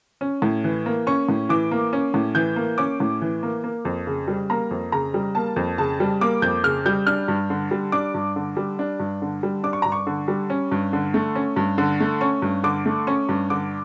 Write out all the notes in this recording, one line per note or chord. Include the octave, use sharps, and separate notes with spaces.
C#4
A2
E3
A#3
C#4 C#6
A2
E3 D6
A#3
C#4
A2
E3 G6
A#3
C#4 D6
A2
E3
A#3
A#3
F2
C#3
G3
A#3 A#5
F2
C#3 A#5
G3
A#3 A5
F2
C#3 A5
G3
A#3 D6
F2 G6
C#3 F6
G3 G6
D4 F6
G2
D3
G3
D4 D6
G2
D3
G3
D4
G2
D3
G3
D4 D6
C#6
G2 A#5
C#6
D3
G3
C#4
G2
D3
A3
C#4
G2
D3
A3
C#4 C#6
G2
D3 D6
A3
C#4 C#6
G2
D3 D6